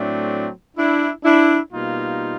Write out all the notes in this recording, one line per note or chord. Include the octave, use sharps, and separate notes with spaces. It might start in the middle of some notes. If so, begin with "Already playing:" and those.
Already playing: A2 F#3 A3 C4 D4
D4 E4
D4 E4
B2 G3 A#3 D#4 F4